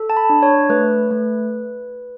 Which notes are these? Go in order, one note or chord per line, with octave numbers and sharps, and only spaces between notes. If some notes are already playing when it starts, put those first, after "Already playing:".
Already playing: A4
A5
B5
D4
C#5
A3 B4
A3